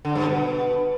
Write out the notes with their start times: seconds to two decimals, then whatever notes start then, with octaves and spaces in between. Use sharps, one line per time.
0.05 D3
0.15 G2
0.26 B2